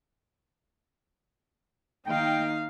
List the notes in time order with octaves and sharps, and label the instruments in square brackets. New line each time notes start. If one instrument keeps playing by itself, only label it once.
[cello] D#3 A#3 [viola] D#4 F5 [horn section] G5